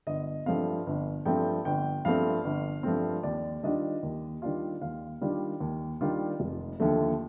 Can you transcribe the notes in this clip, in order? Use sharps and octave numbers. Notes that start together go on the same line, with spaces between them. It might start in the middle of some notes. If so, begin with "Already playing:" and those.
G1 D#5
G2 F3 A3 C4 F5
G1
G2 F3 A3 C4 G5
G1 G5
G2 F3 A3 C4 F5
G1
G2 F3 A3 C4
D#2 D5
D#3 G3 D4 F4 D#5
D#2
D#3 G3 D4 F4
D#2 F5
D#3 G3 D4 F4
D#2
D#3 G3 D4 F4
F1
D#2 D3 F3 A3